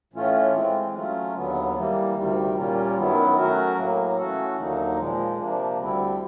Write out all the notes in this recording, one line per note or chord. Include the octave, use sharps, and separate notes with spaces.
A2 E3 A3 C#4 F4
E3 G#3 C4
F#3 A3 C#4 F4
D#2 D3 F#3 B3
E3 G3 A#3
D2 C3 D#3 G3
A#2 G3 A#3 C#4 F4
F#2 D#3 F#3 B3 E4
F#3 A3 C#4 F#4 A#4
A2 F#3 A#3
E3 A3 C#4 F#4 A4
D#2 D3 F#3 A#3 D#4
A#2 F3 G#3
C3 F3 A#3 D4
D2 D3 G3 C4 E4